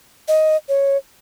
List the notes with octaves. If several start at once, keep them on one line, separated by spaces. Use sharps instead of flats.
D#5
C#5